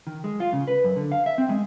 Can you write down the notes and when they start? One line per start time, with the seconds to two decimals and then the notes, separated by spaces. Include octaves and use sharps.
0.07 D#3
0.24 G#3
0.40 F4
0.53 C#3
0.67 B4
0.84 F#2
0.96 D3
1.12 F5
1.26 E5
1.38 C4
1.49 G#3